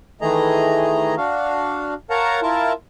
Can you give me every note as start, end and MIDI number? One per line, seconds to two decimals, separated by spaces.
0.21 1.15 51
0.21 1.15 52
0.21 1.15 57
0.21 1.15 68
0.21 1.15 75
0.21 1.15 82
1.17 1.94 62
1.17 1.94 66
1.17 1.94 77
2.10 2.40 70
2.10 2.40 73
2.10 2.40 77
2.10 2.40 78
2.10 2.40 81
2.10 2.40 82
2.42 2.73 64
2.42 2.73 65
2.42 2.73 70
2.42 2.73 81